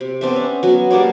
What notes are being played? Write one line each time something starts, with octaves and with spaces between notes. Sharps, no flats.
C3
B3 C4 D4 E5
C#4
F#3 B3 F#4
G3 A#3 D4 C#5